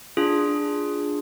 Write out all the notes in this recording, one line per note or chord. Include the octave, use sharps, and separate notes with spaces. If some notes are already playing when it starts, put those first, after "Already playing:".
D4 F4 G#4